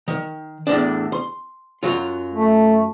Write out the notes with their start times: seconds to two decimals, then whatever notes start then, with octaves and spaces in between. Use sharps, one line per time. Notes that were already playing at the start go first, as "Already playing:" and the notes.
0.08 D#3
0.67 E2 A2 D4
1.12 C6
1.83 F#2 F#3 F4
2.34 A3